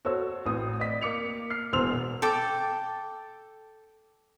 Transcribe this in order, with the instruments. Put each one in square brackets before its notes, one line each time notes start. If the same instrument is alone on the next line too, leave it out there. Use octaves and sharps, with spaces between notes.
[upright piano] F#4 A4 C5 C#5 E6
A1 C4 D#6
D5 D#5 B6
A#3 D6 C#7 F7
F6 C7
E1 E2 C5 C6 E6 F7
[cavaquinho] A4 G5 D6